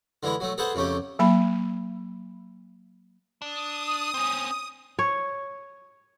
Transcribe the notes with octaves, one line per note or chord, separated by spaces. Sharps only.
D3 E3 G#3 E4
F#3 A3
G#4 A4 B4 C5 F#5
F2 C#3 A3 C#4 G4
F#3 A#3 B5
D4 D#6
C4 C#4
C#5